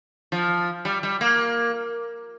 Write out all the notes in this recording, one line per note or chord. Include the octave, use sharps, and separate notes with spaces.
F3
G3
G3
A#3